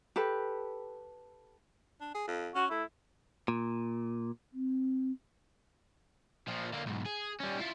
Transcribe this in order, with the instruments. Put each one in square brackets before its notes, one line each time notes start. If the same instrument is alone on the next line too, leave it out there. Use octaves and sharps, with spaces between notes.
[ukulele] G4 A4 B4
[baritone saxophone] D4
G#4
F2
[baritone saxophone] C#4 [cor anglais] F#4
[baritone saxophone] A3 [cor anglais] E4
[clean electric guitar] A#2
[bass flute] C4
[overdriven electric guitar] A#2 F3
D3 A#3
B1 G#2
G#4
G3 C#4
E4 F4